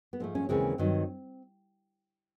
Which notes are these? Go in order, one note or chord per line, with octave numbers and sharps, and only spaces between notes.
B3
G#2 F3 A3 C4
C#4
D#2 C#3 E3 G#3 C4
G2 D#3 F#3